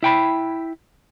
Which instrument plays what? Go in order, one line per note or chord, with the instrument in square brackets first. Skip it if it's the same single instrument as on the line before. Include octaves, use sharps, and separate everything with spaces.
[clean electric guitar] E4 G5 B5